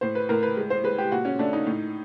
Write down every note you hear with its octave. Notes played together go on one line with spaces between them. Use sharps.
A2 C5
B4
A2 A#4
B4
G#3
C5
G#3 B4
G4
A#2 F#4
C#4
A3 D4
D#4
A2